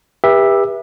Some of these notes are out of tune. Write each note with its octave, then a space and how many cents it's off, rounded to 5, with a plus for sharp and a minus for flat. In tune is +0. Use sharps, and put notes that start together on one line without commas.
G4 +30 B4 -30 E5 +0